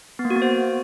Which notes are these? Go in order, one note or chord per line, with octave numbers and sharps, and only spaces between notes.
B3
A#3
F#4
B3
C5